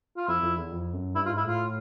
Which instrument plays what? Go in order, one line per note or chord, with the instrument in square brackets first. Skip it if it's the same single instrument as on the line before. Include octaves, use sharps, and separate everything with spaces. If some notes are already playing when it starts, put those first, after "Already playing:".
[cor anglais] F4
[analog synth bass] F2 [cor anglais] E4
[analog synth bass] F2
E2
F2
F#2
[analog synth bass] G2 [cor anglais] E4
[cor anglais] F4
[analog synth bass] G#2
[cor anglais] E4
[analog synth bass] A2 [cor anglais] F4